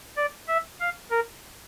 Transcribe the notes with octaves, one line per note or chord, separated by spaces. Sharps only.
D5
E5
F5
A#4